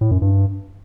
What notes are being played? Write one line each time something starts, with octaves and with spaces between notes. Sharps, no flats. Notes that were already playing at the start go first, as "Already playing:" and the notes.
A2
F#2
G2